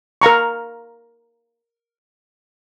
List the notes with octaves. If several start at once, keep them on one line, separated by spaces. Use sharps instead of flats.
A#4 F5 A#5 C#6